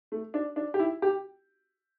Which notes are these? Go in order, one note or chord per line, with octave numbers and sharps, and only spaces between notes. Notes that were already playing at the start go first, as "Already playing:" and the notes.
A3
D4
D4
G4
E4
G4